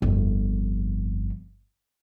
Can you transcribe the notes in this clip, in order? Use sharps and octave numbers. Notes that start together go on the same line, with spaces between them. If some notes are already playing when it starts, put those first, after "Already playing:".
G1 F2